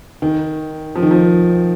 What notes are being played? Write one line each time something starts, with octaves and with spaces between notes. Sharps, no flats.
D#3
F3
D#3
F3